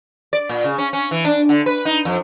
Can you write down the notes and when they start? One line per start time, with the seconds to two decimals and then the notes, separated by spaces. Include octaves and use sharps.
0.33 D5
0.49 A#2
0.64 C#3
0.78 C#4
0.93 C#4
1.11 E3
1.25 D4
1.49 D3
1.66 B4
1.85 D#4
2.05 F2